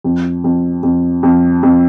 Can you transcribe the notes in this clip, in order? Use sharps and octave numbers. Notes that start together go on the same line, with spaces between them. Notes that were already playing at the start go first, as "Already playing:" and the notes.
F2
F2
F2
F2
F2